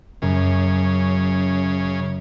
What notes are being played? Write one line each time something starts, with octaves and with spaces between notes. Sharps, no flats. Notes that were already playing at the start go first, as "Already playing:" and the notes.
F#2 C#3